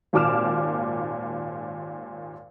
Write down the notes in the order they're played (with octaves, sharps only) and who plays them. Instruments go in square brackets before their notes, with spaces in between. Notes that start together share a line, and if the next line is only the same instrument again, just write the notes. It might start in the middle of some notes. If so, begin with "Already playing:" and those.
[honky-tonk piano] G#1 D#2 A#2 D6 F6 E7